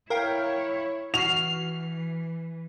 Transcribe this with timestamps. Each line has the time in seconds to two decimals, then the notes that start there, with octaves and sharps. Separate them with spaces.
0.10 E4 A#4 C#5 F5 G5
1.14 E3 F#4 F6 C7 F7